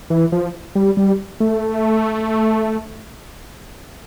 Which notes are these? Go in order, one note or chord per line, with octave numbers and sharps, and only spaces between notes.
E3
F3
G3
G3
A3